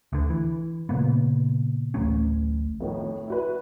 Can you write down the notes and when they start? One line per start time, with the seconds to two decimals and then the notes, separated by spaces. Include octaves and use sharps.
0.13 D2 D3
0.30 E3
0.89 A#2 C#3 A#3 B3
1.94 D1 A1 A3 C#4
2.80 F2 A2 D#3
3.28 E4 F#4 B4